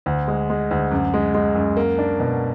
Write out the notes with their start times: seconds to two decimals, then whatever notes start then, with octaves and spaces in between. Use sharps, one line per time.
0.06 D2
0.28 G#3
0.50 G#3
0.71 D2
0.91 F#2
1.14 G#3
1.34 G#3
1.55 F#2
1.77 A#3
1.98 D4
2.20 B2